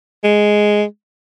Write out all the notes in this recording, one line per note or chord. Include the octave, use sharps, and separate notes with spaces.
G#3